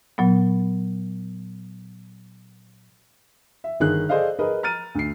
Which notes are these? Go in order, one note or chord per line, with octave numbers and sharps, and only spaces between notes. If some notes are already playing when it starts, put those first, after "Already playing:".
A#2 F#3 B3
E5
G1 D#3 G#4 F#6
G#4 A4 C5 D5 D#5 F5
G#4 A#4 B4 D#5
A#5 F6 A6 D#7
D2 C7